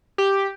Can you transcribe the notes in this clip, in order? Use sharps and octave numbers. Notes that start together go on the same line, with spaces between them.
G4